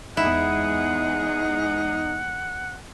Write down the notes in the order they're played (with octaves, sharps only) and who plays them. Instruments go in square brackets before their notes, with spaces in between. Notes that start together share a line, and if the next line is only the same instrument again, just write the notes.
[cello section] E2 G#3 G#4 [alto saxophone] D#4 [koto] E4 [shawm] F#5